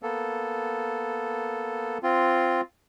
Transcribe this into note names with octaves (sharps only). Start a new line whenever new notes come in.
A#3 B3 A4
C4 F4